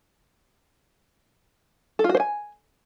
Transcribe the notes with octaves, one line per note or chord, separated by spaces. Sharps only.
A4
F4
F#4
C5
G#5